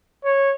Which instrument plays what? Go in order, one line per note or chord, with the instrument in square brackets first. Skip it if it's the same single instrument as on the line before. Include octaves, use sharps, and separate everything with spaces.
[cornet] C#5